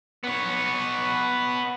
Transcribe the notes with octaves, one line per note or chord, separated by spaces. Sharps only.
B3 C#5